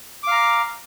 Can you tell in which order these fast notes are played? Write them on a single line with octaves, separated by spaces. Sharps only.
D6 F5 A#5